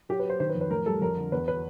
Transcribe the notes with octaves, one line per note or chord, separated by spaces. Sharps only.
F#3 G4
B4
F#3 C5
D#3 C5
B4
F2
B4
A2 A#4
G3 A4
F2 A#4
D3
E2 B4
B4